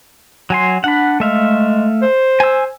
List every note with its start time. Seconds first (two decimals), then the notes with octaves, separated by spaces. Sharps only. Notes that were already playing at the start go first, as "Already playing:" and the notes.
0.50 F#3 G#5 C6
0.84 D4 F#5 B5
1.20 G#3 A3 E5 F5
2.02 C5
2.40 G#5 E6